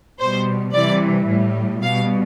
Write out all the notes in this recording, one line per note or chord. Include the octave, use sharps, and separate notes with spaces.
B2 G3 C5
C3 E3 G3 D5
A2 G3
B2 G3 F5